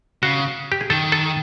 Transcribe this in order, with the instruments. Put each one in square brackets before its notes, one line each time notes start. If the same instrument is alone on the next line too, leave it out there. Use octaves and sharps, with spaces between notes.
[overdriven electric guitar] C#3 [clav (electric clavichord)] F#4
[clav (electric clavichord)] G4
G#4
[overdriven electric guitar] D#3 [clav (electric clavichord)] A4
[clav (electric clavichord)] A4